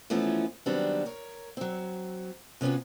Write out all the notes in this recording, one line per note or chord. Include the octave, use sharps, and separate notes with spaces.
E3 F3 A3 B3 C#4 D#4
D#3 F#3 G3 B3 C4 D4
A#4 C#5
F#3 C4
C3 B3 C#4 F4 F#4